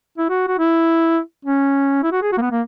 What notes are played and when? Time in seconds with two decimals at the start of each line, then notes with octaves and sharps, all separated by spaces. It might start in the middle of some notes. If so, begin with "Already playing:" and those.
0.18 E4
0.30 F#4
0.48 F#4
0.59 E4
1.45 C#4
2.03 E4
2.12 F#4
2.22 G#4
2.32 F#4
2.38 A#3
2.41 B3
2.52 A#3